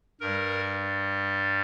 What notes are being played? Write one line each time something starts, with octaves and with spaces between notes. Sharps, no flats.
G2 G3 A#4